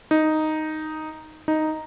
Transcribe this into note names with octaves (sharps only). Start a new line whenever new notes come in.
D#4
D#4